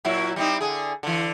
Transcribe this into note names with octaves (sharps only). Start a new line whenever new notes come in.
A#2 F#3 E4
G3 C4 D#4
D3 G#4
D3 E3